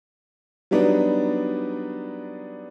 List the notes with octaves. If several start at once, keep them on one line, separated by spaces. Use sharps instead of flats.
F#3 G3 B3 D4 D#4